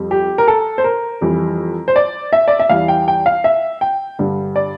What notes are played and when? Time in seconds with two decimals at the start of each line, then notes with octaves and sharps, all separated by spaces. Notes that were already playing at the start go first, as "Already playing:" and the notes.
Already playing: F2 G3
0.11 G4
0.38 A#4
0.48 A4
0.78 C5
0.84 A#4
1.21 F2 E3 G3
1.88 C5
1.96 D5
2.33 E5
2.48 D5
2.59 E5
2.69 E2 E3 G3 F5
2.88 G5
3.08 G5
3.26 F5
3.44 E5
3.81 G5
4.19 G2 D3 G3
4.56 D5